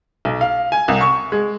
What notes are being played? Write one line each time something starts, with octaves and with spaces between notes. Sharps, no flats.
B1
F5
G#5
C2
C#6
G#3